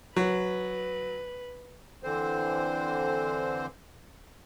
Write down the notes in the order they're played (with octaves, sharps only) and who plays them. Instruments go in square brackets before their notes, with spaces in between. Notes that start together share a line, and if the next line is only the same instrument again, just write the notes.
[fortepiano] F#3 [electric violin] B4
[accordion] D3 E3 C4 C5